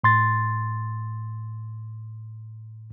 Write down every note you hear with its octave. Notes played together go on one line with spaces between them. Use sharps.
A2 C6 A6